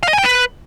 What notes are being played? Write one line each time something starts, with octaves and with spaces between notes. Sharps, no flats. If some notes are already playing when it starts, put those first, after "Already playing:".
F5
D#5
G#5
G5
B4